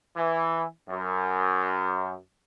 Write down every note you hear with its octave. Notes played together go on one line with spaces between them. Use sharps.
E3
F#2